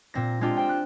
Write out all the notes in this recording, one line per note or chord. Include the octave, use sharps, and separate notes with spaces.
A#2 C4 A#6
G#3 C4 D4 F4 G4
C5 G5
F#6